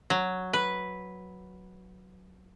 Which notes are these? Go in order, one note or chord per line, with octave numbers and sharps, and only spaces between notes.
F#3
B4